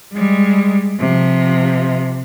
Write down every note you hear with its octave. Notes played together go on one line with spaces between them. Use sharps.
G3 G#3
C3 F3